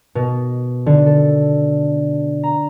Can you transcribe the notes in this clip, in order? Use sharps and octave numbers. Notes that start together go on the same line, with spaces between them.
B2
D3
A4
A#5